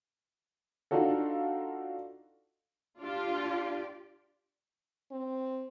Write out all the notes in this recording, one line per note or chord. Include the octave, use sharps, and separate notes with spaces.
D4 D#4 F4 F#4 A4
D4 F4 G4 D5
C4